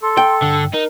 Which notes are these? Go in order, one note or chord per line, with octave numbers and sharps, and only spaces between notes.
A4 C6
G5
G2 D3
D#4 A#4